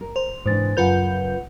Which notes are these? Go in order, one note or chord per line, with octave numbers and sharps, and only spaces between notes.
A#4
C5 F7
G#2 C3 E3 D4 C5 A6
F#2 C#3 F4 B4 F#5 G6 C#7 F7